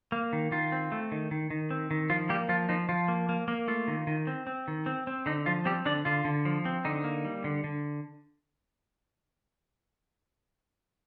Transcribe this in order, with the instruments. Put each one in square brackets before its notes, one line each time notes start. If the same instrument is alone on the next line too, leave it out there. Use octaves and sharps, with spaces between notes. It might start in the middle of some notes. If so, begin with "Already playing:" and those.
[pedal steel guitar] A#3
D#3
D#3 F4
C4
A3
D#3
D#3
D#3
C4
D#3
F3 F4
G3 A#3 G4
F3 F4
F3 D#4
F3 F4
A#3
A#3
A#3
A3 F4
D#3
D#3
C4
C4
D#3
C4
C4
D3 D#4
F3 F4
G3 C4 G4
D3 D4 D5
D3 F4
D3
F3
C4
D3 D#4
A#3
G3
D3
D3